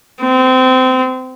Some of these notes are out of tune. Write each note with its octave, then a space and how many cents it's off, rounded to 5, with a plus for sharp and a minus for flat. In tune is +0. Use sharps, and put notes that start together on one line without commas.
C4 -25